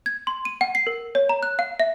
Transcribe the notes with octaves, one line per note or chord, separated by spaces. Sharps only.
G#6
C6
D#7
F#5
C7
A#4
C#5
A#5
F#6
F5
E5